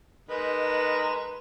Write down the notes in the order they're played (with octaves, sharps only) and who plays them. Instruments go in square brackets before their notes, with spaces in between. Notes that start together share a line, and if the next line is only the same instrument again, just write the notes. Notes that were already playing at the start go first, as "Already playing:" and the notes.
[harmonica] G#3 [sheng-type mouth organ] D#4 A#4 [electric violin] B4